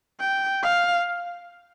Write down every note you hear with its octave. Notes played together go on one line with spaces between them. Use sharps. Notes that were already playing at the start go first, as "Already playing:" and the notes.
G5
F5